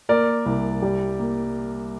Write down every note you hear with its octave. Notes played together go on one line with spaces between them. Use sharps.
A#3 A#4 D5
C2
G3
A#3